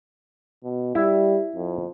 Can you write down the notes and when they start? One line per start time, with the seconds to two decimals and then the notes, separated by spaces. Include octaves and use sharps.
0.64 B2
0.95 G3 E4
1.55 F2